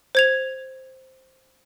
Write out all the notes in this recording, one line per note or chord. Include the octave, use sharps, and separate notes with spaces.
C5 G#6 F7